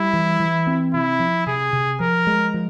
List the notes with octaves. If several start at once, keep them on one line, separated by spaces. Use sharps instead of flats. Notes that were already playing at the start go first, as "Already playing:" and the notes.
Already playing: G3 E4
E3
E3
C4
C3 E4
F3
C3 G#4
C3
F3 A#4
G#3
F3